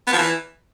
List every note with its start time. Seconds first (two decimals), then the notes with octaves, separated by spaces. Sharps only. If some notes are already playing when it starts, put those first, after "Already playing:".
0.07 B3
0.13 F3
0.18 E3